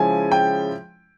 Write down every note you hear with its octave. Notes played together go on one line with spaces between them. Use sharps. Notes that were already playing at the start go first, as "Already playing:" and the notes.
Already playing: C#3 F3 G#3 C#4 E4 G#5
G5